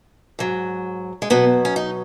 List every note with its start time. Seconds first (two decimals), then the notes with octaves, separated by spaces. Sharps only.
0.39 G#2 F#3
1.22 G#3
1.30 B2 F#3 B3
1.65 C#4
1.76 D#4